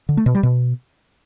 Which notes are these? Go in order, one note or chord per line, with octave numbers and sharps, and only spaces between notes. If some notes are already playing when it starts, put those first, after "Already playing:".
D3
A3
B2
G3
B2